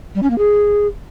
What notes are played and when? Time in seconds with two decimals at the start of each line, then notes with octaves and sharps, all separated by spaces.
0.15 G3
0.23 C#4
0.30 A#3
0.38 G#4